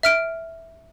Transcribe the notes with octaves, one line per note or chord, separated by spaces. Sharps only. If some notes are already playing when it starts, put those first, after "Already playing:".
E5 F6 D7